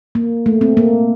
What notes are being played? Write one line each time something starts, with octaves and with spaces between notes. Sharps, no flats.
A#3
A3
C4
A#3